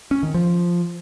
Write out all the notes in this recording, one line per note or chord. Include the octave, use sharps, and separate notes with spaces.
C#4
D#3
F3